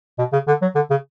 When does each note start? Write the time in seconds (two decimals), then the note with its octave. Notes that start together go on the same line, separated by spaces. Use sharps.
0.19 B2
0.33 C#3
0.48 D3
0.62 F#3
0.75 D3
0.90 C#3